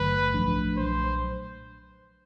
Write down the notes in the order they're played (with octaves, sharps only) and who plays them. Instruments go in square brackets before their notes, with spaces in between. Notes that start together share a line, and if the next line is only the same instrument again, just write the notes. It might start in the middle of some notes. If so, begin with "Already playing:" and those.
Already playing: [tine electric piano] G#1 G2 D3 F#3 A3 [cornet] B4
[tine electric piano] B1 A2 F3 A3 D4
[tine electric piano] B1 A#2 F#3 [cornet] C5